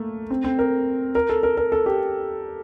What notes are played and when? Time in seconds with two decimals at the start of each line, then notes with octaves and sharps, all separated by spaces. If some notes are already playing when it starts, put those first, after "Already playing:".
Already playing: A3 A#3
0.30 C4
0.44 C4
0.59 A#4
1.15 A#4
1.30 A4
1.43 A#4
1.57 A#4
1.72 A4
1.86 G4